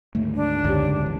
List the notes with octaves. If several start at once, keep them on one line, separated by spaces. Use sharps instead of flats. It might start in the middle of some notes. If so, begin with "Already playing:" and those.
D2 G#2 D#3 A3
D4
C#2 F#2 D3 G4 C#5 A5
F1 E3